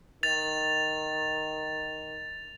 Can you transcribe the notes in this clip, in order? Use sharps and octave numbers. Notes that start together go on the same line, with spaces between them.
D#3 A6 F7